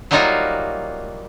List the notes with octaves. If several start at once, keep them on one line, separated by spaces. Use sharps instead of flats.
F#3 G3 A#3 D#4 F4 F#4